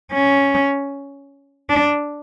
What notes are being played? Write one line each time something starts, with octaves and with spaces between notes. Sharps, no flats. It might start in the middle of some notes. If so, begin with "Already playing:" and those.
C#4
D4